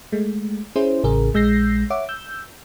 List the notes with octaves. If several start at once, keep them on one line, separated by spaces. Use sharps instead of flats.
G#3 A3
C#4 E4 G#4 C5
A1 C#3 G#4 A#4
A#1 G#3 E6 G6 A#6 C7
C#5 E5 F#5 D6
E6 G6